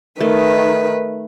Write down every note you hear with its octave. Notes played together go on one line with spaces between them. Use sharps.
D#3 A3 B4